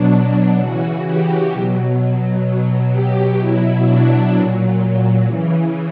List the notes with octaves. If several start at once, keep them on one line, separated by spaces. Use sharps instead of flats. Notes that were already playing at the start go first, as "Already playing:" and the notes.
Already playing: B2 F#3 D4
D4
C#3 E3 F#4
G4
B2 F#3
B2 F#3
G4
B2 F#3 E4
D4
A#2 F#3
C#3 E3